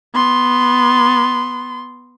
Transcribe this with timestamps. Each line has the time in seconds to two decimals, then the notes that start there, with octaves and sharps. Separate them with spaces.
0.14 B3 C6